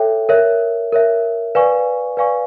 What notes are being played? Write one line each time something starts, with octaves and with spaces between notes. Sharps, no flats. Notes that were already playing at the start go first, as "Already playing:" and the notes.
Already playing: A4 C#5 E5 G5
A#4 C#5 E5
A#4 C#5 E5
B4 D5 F5 G#5 C#6
B4 D5 F5 G#5 C#6